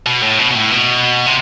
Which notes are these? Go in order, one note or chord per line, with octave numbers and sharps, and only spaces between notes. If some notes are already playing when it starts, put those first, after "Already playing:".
B2
A2
B2
B2
A2
B2
C3